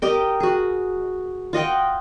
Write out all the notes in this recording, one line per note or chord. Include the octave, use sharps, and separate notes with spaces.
G4 A#4 D#5 G5
F#4 G#4
F4 D#5 F#5 G5